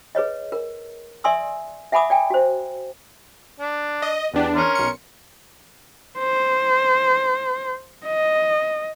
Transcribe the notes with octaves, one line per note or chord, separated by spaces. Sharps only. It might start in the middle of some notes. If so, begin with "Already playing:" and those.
G#4 B4 C#5 D#5
A#4
D5 E5 G#5 C6 D#6 E6
E5 F#5 G#5 B5 D6 D#6
D5 G5 G#5
F#4 C5
D4
D#5
E2 B3 D4 G4
C#4 A#4 C6
B1 C#7
C5
D#5